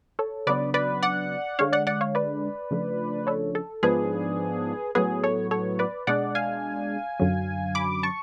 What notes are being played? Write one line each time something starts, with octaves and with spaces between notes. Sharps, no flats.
A4 C#5
C#3 F#3 B3 D4 B4 D5
B4 D5
D5 F#5
D3 G#3 D4 C#5 F5
D5 F#5
D5 F#5
C#5 F5
B4 D5
C#3 F3 A3 D4
A4 C#5
A4
G#2 F3 B3 D4 G#4 B4
A2 F#3 B3 G#4 B4
A4 C#5
A4 C#5
B4 D5
B2 G#3 D4 D5 F#5
F5 G#5
F#2 D3 F#3
B5 D6
A5 C#6